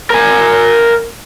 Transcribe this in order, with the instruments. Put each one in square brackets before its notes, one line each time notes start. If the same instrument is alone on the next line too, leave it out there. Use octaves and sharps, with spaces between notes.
[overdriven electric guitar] A#4 G#5